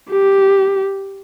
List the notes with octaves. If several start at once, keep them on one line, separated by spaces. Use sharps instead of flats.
G4